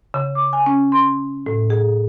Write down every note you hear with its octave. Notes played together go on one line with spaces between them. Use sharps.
C#3
D6
G#5
C#4
C6
A2
G#4